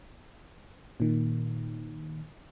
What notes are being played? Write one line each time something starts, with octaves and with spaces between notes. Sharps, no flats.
A#2 D#3